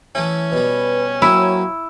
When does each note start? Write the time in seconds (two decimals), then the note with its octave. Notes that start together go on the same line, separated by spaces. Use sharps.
0.15 E3 A3 C#4 E4
0.52 B2 G3 B4
1.22 F#3 A#3 C4 E4